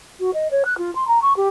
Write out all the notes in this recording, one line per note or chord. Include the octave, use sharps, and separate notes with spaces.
F#4
D#5
C#5
F#6
F4
C6
A#5
C#6
G4